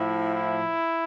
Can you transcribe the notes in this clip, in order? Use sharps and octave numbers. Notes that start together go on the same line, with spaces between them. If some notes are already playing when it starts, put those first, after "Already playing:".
Already playing: A2 F3 E4
E4